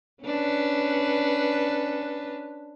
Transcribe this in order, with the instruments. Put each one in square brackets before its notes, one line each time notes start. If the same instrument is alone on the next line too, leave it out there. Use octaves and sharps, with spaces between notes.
[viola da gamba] C#4 D4 B4